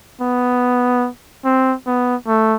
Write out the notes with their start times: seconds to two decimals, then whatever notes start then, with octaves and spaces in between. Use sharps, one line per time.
0.21 B3
1.45 C4
1.87 B3
2.28 A3